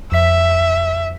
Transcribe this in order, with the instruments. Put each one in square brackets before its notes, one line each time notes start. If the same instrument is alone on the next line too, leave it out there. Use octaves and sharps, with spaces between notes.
[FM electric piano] F2 B6 [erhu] E5